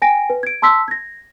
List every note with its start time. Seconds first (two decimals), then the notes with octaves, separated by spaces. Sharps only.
0.02 G5 G#5 A#6 D7
0.30 B4
0.43 G#6 D7
0.62 A5 C6 E6 B6
0.88 G#6 A#6